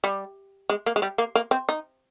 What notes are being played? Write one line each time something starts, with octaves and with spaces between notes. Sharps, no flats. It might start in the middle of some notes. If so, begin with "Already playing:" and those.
G3
G#3
A#3
G#3
G3
A#3
A#3
C4
D#4